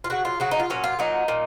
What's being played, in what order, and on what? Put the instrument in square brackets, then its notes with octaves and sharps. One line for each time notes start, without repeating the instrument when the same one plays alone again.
[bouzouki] F4
C#3 F#3 F#4
F4
C#3 F#3 F#4
D#4
F4
A#2 F#3 C#4
F4
A#2 F#3 D#4
A#2